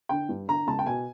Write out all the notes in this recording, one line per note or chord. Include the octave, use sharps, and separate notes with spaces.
D3 G5
G2
D3 A#5
C#2 A5
G5
B2 G#5